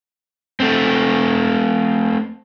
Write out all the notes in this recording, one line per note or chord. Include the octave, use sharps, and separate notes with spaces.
A3 C4